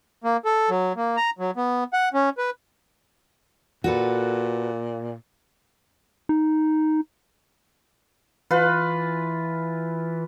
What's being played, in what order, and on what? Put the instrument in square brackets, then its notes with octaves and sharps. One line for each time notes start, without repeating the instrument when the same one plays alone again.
[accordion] A#3
A4
F#3
A#3
A#5
F#3
B3
F#5
C#4
B4
[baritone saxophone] A#2 [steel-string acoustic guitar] F#4 A4 B4
[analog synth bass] D#4
[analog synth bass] E3 [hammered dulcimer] F4 B4